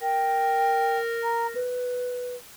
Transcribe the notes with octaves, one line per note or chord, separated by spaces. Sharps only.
A#4 G5
A#5
B4